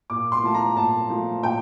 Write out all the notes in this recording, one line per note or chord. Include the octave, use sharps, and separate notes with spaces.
A#2 D6
C6
F3 A3 A5
A#5
A#2 A5
F3 A3
A#2 G5